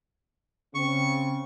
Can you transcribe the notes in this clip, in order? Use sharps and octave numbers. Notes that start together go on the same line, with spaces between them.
C#3 C4 C#6